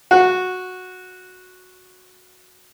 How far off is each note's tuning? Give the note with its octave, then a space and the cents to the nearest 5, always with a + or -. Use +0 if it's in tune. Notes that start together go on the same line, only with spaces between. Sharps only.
F#4 -10